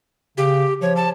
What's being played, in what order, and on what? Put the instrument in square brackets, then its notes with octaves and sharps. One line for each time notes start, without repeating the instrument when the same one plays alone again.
[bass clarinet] C#3 [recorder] G4
[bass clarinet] F3 [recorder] C#5
[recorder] A5